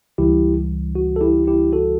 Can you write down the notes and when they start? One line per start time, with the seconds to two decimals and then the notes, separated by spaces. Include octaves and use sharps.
0.18 C#2 C#3 E3 G3 E4 G4
0.95 F#4
1.16 A4
1.21 E4 G4
1.47 E4 G4
1.73 F#4 A4